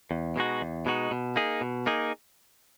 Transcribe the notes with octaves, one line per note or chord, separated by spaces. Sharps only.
E2
B2 G#3 D#4 F#4
E2
B2 G#3 D#4 F#4
B2
A#3 D#4 G#4
B2
A#3 D#4 G#4